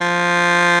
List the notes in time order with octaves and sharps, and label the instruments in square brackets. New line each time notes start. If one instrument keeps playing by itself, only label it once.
[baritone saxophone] F3